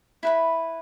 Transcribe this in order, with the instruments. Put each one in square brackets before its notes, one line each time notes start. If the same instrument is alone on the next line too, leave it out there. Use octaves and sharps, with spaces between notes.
[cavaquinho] E4 B4 B5